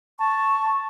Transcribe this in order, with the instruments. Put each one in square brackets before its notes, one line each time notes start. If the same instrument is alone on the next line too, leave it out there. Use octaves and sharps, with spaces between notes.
[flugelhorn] A5 [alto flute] C#6